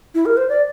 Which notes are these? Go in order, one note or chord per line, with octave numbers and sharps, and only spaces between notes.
E4
A#4
C5
D5